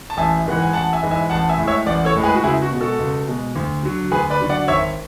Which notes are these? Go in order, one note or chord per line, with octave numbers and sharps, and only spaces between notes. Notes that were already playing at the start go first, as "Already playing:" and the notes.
A5
A1 E5 G#5
G#2 E3 G#3 F#5
G#5
A1 F#5 A5
E5 G#5
G#2 E3 G#3
E5 G#5
A1 F#5 A5
E5 G#5
A2 G#3
C#5 E5
A1 D5 F#5
A4 C#5
A2 G#3
G#4 B4
F#4
C#2 E4 G#4
F#4
B2 G#3
F#4 A4
C#2
B2 G#3
D2
D3 F#3
D2 G#4 B4
B4 D5
D3 F#3
D5 F#5
G#1 C#5 E5